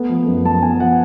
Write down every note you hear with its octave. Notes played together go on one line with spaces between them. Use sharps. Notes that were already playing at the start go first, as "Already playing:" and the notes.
Already playing: A3 B3
F3
F#2
F#2 A5
B3 G#5
F3 F#5